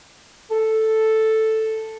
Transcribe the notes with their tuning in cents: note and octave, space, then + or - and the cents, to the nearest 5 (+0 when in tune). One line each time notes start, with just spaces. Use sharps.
A4 +0